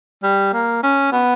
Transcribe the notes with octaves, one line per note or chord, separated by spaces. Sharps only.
G3
A#3
C#4
B3